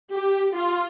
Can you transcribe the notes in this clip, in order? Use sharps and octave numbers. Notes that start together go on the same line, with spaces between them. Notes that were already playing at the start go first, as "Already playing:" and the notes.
G4
F4